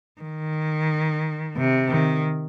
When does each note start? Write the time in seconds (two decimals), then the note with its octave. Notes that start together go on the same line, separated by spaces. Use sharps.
0.21 D#3
1.56 C3
1.90 D#3